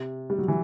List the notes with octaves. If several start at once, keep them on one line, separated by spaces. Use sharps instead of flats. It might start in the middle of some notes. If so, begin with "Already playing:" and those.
Already playing: C3
G3
F#3
E3